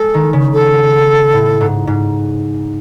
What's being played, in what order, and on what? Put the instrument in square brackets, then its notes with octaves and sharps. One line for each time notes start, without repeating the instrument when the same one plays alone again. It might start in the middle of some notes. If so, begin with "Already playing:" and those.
Already playing: [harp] G#3 [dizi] A4
[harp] D#3
C#3
[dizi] A4
[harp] A2
G#2
G#2